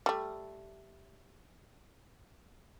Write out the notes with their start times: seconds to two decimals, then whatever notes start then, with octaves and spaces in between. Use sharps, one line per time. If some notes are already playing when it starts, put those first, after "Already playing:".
0.06 G3 A3